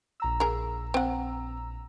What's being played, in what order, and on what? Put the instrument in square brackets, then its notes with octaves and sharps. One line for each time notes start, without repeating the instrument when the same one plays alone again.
[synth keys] A#1 A#5 E6
[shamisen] G#4 A#4
C4 F#5